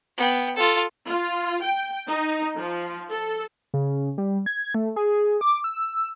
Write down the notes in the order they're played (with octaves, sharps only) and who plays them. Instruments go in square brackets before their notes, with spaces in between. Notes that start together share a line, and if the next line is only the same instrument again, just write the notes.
[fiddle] B3 G5
F4 A4
[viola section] F4
G5
D#4
F3
A4
[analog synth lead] C#3
G3
G#6
A3
G#4
D6
E6